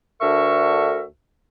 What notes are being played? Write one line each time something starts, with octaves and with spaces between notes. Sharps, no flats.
D2 D3 A#4 E5 C#6